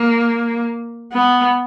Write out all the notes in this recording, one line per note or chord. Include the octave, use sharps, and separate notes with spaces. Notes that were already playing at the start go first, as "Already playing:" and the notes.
Already playing: A#3
B3